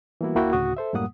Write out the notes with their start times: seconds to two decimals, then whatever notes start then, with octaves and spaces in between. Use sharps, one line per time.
0.21 E3 G3 A#3 B3 E4 F#4
0.35 D2 A#3 E4 F#4 G5
0.53 D2 A2 C#3 F#4 D#6
0.77 A4 C5 E5
0.93 F#2 A2 G3 A#3 F#5 D#6